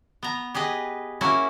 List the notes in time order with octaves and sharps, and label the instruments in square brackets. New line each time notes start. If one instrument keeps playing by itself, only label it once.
[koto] B3 A#5
G4 G#4 B4 D#5
A#3 C#4 E4 F#4